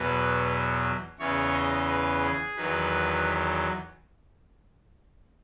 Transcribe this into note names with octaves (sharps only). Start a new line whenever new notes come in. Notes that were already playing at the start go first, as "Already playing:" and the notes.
Already playing: E2 B2 F#3 B4
E2 C#3 E3 C#5
D#5
B4
G#4
E2 D#3 F#3 B4